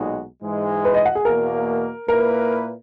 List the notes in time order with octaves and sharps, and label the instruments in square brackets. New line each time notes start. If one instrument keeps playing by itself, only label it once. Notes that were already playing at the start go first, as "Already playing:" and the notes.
Already playing: [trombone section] B1 A#2 G#3 D#4 F#4
G#2 E3 G#3
[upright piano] B4
D#5
F#5
G#4
[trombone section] E2 B2 A#3 [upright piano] A#4
[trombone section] A#2 A#3 E4 B4 [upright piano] A#4